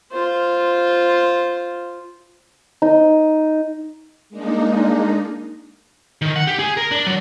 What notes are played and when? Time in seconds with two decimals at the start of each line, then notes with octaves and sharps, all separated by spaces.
0.12 F4 C5
2.82 D#4
4.29 G#3 A#3 D4 D#4
6.22 D#3
6.36 F#5
6.47 G4
6.59 G#4
6.77 A#4
6.91 D4
7.07 F#3